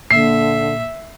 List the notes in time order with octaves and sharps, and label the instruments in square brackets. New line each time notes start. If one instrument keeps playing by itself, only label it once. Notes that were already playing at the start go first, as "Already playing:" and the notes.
[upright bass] A#2 [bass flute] D3 [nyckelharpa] E5 [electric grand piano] C7